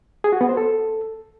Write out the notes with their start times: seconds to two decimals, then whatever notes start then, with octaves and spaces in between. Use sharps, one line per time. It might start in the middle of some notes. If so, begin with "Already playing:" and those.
0.24 G#4
0.33 F#4
0.41 B3
0.49 C5
0.57 A4